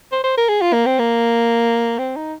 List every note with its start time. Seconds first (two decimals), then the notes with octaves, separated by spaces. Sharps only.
0.12 C5
0.24 C5
0.38 A#4
0.49 G#4
0.62 F4
0.73 A#3
0.86 C4
0.99 A#3
1.98 C4
2.16 D#4